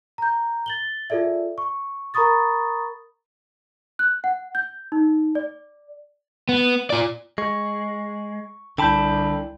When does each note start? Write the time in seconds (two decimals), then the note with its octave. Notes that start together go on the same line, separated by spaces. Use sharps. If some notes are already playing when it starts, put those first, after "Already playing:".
0.18 A#5 G6
0.66 A6 F#7 G7
1.10 F4 G#4 A4 D5 E5
1.58 C#6
2.14 A#4 A#5 B5 C#6 D#6 A6
3.99 F#6
4.24 F#5
4.55 G6
4.92 D#4
5.35 D5
6.49 B3
6.90 F4 D5
7.38 G#3 C#6
8.78 C2 D3 G5 A5 B5 G6